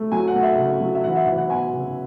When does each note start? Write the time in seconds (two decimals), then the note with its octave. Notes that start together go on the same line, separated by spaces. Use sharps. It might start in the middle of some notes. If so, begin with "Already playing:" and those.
Already playing: A3
0.12 F#3 G#5
0.28 F#5
0.34 A3
0.43 E5
0.58 C#3
0.81 F#3
0.95 E5
1.04 E3 F#5
1.16 E5
1.27 E3 F#5
1.38 F#5
1.50 B3 G#5
1.73 C#3